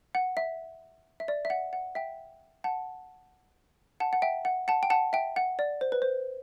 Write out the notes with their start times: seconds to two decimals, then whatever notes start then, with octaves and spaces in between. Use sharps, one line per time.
0.15 F#5
0.37 E5
1.20 E5
1.28 D5
1.45 E5
1.50 F#5
1.73 F#5
1.95 E5 G5
2.64 F#5 A5
4.00 F#5 A5
4.13 F#5
4.22 E5 G5
4.45 F#5
4.68 F#5 A5
4.83 G5
4.90 F#5 A5
5.13 E5 G5
5.36 F#5
5.59 D5
5.81 C5
5.92 B4
6.02 C5